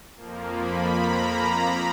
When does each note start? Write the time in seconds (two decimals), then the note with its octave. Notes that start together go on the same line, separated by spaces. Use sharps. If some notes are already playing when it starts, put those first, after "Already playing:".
0.16 F2 F3 A#3
0.54 B5
0.93 A#5